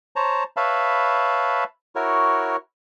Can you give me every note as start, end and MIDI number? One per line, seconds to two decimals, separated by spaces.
0.16 0.44 72
0.16 0.44 73
0.16 0.44 81
0.16 0.44 82
0.57 1.64 71
0.57 1.64 73
0.57 1.64 76
0.57 1.64 77
0.57 1.64 81
0.57 1.64 83
1.95 2.56 64
1.95 2.56 66
1.95 2.56 70
1.95 2.56 73